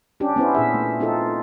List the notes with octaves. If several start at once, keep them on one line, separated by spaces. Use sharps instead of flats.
C#4 D4 G4
B3 C#4 E4 C5
A#2 D4 G#4 E5
A3
C4 D#4 F4 A4